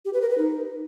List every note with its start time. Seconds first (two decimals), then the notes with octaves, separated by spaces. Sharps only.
0.05 G4
0.13 B4
0.22 A#4
0.30 B4
0.38 D#4